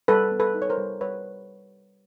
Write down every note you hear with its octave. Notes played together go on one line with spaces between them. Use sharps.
G3 A4 B4
B3
A4 B4
D#4
C#5
A#4 C5
G3
G3 B4 C#5